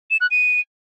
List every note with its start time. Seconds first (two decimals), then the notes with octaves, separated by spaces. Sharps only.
0.11 E7
0.21 F#6
0.31 D#7